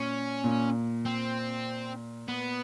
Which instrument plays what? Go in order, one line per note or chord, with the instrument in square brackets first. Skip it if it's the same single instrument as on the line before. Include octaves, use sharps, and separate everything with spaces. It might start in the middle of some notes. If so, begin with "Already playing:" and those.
Already playing: [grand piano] A#2 [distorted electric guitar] C#4
[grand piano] A#2
[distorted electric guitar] C4
B3